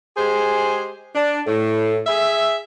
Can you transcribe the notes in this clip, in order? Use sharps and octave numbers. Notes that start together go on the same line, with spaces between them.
G#3 G4 G#4 C5
D4
A2
G#4 E5